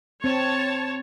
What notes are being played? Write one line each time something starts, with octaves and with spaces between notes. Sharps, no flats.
C4 C#5 A5